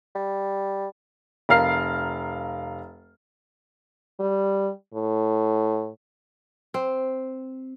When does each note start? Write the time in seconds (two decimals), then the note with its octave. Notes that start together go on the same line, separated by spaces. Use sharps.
0.15 G3
1.49 F1 A#4 F5 F6 C7
4.20 G3
4.94 A2
6.74 C4